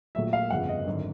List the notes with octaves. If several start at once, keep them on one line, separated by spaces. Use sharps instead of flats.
A#1 A#2 F#3 A3 E5
F5
G1 F2 C#3 F#5
D#5
G#1 F#2 D3